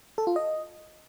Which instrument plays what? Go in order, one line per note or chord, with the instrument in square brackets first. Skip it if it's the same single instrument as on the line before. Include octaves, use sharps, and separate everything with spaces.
[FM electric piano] A4
F4
D#5